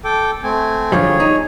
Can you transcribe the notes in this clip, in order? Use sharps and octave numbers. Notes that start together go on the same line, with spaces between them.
A4 G5 D6
A3 C4 G#5
D3 F3 G3 G#4 C#5
D#4